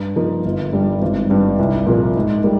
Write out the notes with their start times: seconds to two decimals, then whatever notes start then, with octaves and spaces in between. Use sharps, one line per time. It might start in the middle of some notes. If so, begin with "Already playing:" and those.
Already playing: G2
0.16 F3 A#3 D#4
0.45 G1
0.72 G2 G3
1.01 G#1
1.30 G2 G3
1.59 C2
1.86 A#2 F3 A#3 F4
2.16 G#2
2.44 G3 A#3